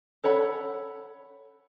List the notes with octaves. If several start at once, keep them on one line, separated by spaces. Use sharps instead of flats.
A4 C#5 F#5 B5